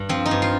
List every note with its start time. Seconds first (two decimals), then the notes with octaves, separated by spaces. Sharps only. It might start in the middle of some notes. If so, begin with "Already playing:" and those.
Already playing: G2 D4
0.09 F3 C4
0.25 D#4
0.31 G2
0.42 F4